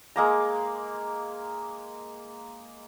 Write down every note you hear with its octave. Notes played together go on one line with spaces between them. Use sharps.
G#3 A#3 A#5